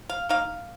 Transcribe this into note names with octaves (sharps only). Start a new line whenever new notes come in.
F5
D#3 A#3 D#4 F5